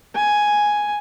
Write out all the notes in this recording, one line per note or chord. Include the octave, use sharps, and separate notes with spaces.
G#5